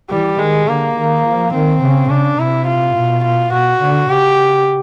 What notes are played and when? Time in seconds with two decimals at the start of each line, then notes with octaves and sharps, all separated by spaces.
0.10 E3 G3
0.39 D#3 G#3
0.67 D3 A#3
0.97 D#3
1.25 F3
1.53 D#3 C4
1.82 C#3
2.10 C#3 D4
2.38 C3 E4
2.67 F4
2.96 B2
3.24 F4
3.53 B2 F#4
3.81 D3
4.09 C#3 G4